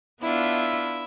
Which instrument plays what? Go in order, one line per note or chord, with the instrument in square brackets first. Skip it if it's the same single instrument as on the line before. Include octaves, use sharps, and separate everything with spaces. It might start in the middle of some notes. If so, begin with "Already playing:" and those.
[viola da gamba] B3 D4 F4 [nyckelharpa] E4 E5